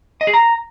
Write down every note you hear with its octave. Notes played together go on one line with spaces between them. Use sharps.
D#5
G#4
A#5